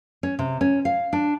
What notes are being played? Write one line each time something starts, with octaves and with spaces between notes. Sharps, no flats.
C#4
C3
C#4
F5
D4